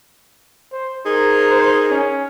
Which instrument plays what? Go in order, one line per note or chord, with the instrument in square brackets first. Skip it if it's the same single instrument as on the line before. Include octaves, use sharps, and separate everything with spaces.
[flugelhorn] C5
[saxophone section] D#4 G#4 A#4 [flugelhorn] C5
[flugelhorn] C5
C#4